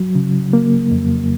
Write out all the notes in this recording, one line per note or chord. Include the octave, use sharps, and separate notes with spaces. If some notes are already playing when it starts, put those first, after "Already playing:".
Already playing: F#3
C#3
A#3
F2